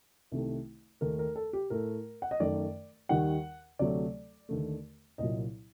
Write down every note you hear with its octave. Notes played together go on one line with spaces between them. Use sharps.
C2 C3 D#3 A3
D#2 D#3 A3 A#4
A#4
A4
G4
A2 A3 A#4
F#5
D#5
F#2 D#3 A3 D5
D#2 D#3 G3 F#5
D2 C3 F#3 A3 D5
D#2 D3 A3
C2 A#2 F#3 D#5